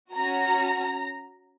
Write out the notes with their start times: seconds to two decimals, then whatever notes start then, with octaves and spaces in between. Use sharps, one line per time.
0.14 C#4 F#4 A#5